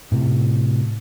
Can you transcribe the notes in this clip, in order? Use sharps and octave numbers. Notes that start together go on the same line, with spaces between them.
A2 C3